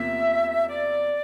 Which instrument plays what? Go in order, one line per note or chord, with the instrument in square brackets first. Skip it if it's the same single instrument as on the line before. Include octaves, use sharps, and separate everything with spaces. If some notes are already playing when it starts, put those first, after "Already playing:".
Already playing: [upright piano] E2 C3 F3 A#3 [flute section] E5
[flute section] D5